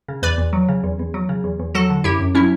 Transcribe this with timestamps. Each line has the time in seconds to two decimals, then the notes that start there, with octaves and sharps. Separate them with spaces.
0.08 C#3
0.22 E2 B4 D5
0.38 E2
0.53 F#3
0.68 C#3
0.84 E2
0.99 E2
1.14 F#3
1.29 C#3
1.44 E2
1.60 E2
1.75 F#3 F#4 A4
1.90 D3
2.04 F#2 E4 G4
2.19 F#2
2.35 F#3 C#4 E4